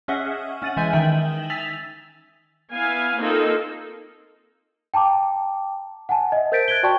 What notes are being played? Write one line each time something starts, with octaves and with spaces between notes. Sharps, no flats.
C#4 G#4 D#5 E5 F#5
C#4 F#5 A6 D#7 F#7
E3 G#3 E5 G#5 G6 D#7
D#3 D#4 E5 G5 F#7
G#5 E6 A6 B6 F7
B3 E4 F5 G#5
A#3 C4 D#4 F4 A4
G5 A5 A#5 D6
F#5 G#5 A5
D#5 E5
A#4 C5 G6 A6 B6 D7
F#6 G#6 D7 G7
F#4 D5 G5 A5 C#6